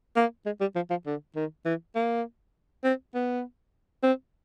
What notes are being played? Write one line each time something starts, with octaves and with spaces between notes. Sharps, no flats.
A#3
G#3
G3
F3
F3
D3
D#3
E3
A#3
C4
B3
C4